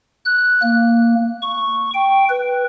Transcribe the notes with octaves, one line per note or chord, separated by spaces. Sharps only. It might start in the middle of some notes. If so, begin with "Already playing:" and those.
F#6
A#3
C#6
G5
B4